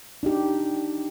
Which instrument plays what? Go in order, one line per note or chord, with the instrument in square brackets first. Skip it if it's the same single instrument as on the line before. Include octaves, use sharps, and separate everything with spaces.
[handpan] D4 D#4 G4